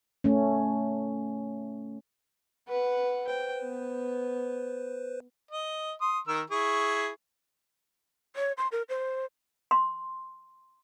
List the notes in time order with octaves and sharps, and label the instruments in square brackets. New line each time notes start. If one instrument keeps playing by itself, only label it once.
[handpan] A3 C#4
[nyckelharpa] B4 F#5
[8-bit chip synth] B4 C5 [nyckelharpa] G5
[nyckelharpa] B3
[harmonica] D#5
C6 D#6
D#3 A#4 E6
E4 G#4 C#6
[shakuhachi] C#5
C6
A#4
C5
[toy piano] C6